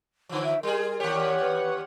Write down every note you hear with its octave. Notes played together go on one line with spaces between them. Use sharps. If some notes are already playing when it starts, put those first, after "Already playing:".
D3 F3
E5
G3 G#4 A#4
D#2 G4 C#5 F#5
B4